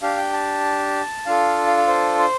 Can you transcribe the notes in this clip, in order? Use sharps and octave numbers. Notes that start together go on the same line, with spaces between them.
D4 G4 F5
G5
A5
D4 F4 A4 F5
F5
F5
C5
C5